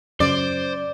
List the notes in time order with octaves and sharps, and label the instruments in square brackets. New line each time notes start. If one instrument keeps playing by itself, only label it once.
[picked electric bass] F#2 C#3 [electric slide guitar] C5 [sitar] D5